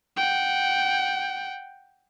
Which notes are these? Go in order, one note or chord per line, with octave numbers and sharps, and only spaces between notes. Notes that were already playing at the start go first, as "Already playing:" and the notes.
F#5 G5